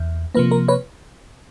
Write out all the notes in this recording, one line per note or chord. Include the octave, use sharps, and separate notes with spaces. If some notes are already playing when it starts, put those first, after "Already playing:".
Already playing: E2
C3 F3 A#3 B4
A#4
B4 C#5